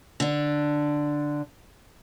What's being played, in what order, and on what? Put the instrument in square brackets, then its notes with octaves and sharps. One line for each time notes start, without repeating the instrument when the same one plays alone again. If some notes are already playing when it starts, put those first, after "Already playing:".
[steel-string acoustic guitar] D3 D4